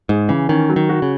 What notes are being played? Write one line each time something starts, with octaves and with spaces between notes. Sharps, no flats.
G#2 G#4
C#3 E3
D#3 C#4
F#3
D#3
F#4
C#3